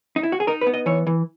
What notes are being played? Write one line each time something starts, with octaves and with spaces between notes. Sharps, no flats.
D#4
E4
F#4
G#4
D#4 A#4
B4
B3
D#5
E3 C#5
E3